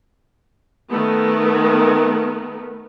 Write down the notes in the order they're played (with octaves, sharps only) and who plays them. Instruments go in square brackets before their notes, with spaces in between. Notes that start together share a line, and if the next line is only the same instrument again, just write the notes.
[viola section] D#3 A3 B3